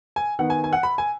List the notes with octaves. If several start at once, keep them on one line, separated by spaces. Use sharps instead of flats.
G#5
D#3 B3 F#5
G#5
G#5
F#5
B5
G#5